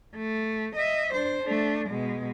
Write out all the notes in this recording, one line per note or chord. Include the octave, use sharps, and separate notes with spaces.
A3
D#5 E5
D4 C5
A3 D4
B2 G#3